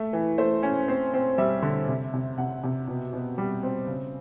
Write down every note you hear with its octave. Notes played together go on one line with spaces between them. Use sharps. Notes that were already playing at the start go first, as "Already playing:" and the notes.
Already playing: A3
E3
A3 C5
C#4
C4
C4
G3 E5
D3
C3
C3
C3 F#5
C3
B2
B2
G3
C4
C#3